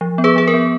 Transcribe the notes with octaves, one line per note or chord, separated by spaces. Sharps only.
F3
B3
G#4 B4
F3 G#4
A#4
B3